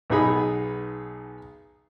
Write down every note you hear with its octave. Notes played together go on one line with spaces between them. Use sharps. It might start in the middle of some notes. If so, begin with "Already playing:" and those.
B1 B3 D#4 G#4 B5